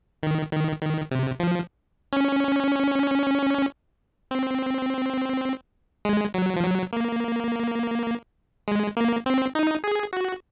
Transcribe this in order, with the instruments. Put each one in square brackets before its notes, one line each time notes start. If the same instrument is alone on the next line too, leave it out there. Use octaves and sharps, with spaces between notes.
[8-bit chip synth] D#3
D#3
D#3
C3
F3
C#4
C4
G#3
F#3
F3
F#3
A#3
G#3
A#3
C4
D#4
G#4
F#4